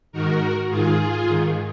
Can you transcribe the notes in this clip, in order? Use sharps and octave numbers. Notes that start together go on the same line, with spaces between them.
G#2 D#3 F#4 A#4
G#2 D#3 F4 G#4
G#2 D#3